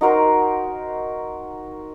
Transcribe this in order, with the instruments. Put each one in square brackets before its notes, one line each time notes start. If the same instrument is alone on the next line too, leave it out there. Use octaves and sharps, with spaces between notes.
[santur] D#4 F#4 A#4 C5